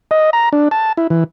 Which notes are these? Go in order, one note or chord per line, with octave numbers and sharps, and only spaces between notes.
D#5
A#5
D4
A5
E4
E3